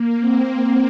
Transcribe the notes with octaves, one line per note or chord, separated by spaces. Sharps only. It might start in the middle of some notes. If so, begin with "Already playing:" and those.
Already playing: A#3
C4
A#3